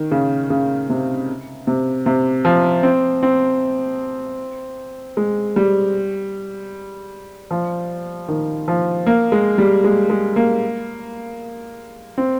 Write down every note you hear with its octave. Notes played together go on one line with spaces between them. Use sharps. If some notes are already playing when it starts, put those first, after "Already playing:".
Already playing: D#3
C#3
C#3
C3
C3
C3
F3
C4
C4
G#3
G3
F3
D#3
F3
A#3
G#3
G3
G#3
G#3
A#3
C4